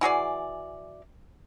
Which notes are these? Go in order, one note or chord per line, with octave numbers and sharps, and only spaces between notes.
E3 F#4 G#4 D5